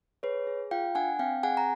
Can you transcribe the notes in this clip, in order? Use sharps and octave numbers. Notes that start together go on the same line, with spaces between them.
G#4 B4 C#5
G#4
F4 F5 G5
D4 F#5 G#5
C4 F5 G5
G#4 F#5 G#5
A#5